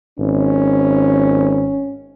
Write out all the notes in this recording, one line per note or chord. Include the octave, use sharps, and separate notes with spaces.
G#1 C#4